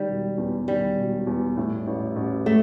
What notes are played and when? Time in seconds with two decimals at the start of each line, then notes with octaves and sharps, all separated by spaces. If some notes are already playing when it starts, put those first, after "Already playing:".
Already playing: D#3 G3
0.08 E1
0.38 E2
0.68 D#3 G3
0.97 E1
1.27 E2
1.57 A2
1.87 A1
2.16 A1
2.46 A3